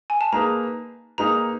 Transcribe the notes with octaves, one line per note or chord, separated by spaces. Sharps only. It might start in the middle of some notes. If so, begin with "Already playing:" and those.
G#5
A5
A#3 D#4 G#4 B4 A#5
A#3 D#4 G#4 B4 A#5